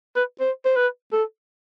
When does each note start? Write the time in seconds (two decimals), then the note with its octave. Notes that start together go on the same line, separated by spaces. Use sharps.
0.16 B4
0.40 C5
0.65 C5
0.76 B4
1.12 A4